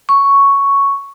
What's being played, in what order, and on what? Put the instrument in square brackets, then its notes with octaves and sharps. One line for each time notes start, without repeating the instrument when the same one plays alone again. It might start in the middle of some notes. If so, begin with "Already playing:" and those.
[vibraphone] C#6